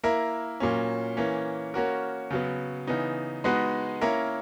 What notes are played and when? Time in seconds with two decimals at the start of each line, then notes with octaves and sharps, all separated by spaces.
0.03 A#3 E4 A#4
0.60 A#2 F#3 A#3 C#4
1.17 E3 A#3 C#4
1.74 A#3 C#4 F#4 A#4
2.31 C#3 F#3 B3
2.87 C#3 E3 B3 D#4
3.44 G#3 B3 D#4 F#4 B4
4.01 A#3 C#4 E4 A#4